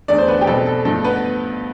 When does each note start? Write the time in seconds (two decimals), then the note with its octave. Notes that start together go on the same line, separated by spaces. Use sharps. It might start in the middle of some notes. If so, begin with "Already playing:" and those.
0.08 E2 D3 A3 D4 D5
0.18 C5
0.28 B3 B4
0.41 G4
0.47 B2 G3 C4 A4
0.66 A4
0.85 G2 F3 A3 A4
1.04 B3 B4